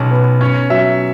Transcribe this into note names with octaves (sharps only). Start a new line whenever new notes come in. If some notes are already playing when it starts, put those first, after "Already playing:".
Already playing: B1 C#4
B3
C#4 C#5
F#3 E5